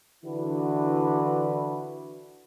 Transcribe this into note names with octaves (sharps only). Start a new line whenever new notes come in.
D3 E3 D4 E4 F#4 B4